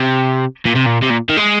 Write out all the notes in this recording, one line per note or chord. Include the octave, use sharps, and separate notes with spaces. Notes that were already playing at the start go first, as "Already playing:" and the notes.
Already playing: C3
A#2
C3
A#2
C3
A#2
D#3
G#3